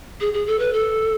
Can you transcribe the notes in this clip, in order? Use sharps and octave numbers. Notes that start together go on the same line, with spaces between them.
G#4
G#4
A4
B4
A4